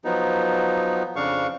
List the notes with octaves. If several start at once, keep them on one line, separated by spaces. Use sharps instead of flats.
F3 F#3 B3 D#4
F2 C#3 D4 F5 C#6